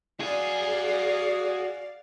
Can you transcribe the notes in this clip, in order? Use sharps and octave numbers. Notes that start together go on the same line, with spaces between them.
F#4 G#4 D5 F5 G#5